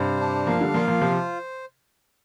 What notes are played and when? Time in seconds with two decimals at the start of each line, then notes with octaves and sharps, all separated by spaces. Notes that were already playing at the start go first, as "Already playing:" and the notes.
Already playing: G2 C3 C5
0.20 D4
0.47 F3 A#3 F5
0.61 D3 G3
0.74 F3 A#3 F4
0.87 F3 A#3
1.01 C3 F3 C5